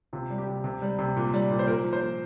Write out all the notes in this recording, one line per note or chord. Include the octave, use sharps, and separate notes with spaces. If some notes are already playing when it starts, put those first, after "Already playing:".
C3 F4
G3
G4
C3
C3
G3
C3
A#2
G3
A#2
C5
A#2 A#4
F3
C5
A#2